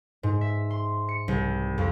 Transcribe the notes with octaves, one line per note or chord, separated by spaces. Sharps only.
G#2
E5
C6
C#7
C2
F2